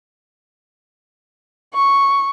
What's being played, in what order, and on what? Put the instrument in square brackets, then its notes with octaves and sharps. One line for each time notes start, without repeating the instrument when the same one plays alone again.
[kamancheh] C#6